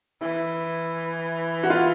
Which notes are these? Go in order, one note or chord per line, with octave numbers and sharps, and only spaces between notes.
E3 E4
F#4
F4